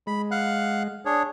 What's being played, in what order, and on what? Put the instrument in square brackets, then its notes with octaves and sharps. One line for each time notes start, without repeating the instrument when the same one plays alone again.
[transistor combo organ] G#3 [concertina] B5
[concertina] F5 F#5 F#6
D4 G#4 C#5